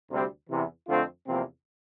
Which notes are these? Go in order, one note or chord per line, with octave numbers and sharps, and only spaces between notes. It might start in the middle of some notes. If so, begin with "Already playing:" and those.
D2 C3 G3 C4
E2 C3 E3
F2 D3 A3 C4 F4
E2 C3 F3 A#3 C4